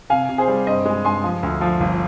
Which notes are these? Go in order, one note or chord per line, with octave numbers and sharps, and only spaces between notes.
C3 F5 G#5
C3
G#4 C5
G3
G2 C5 D#5
G#3
G2 G#5 C6
F3
D2
F3
G1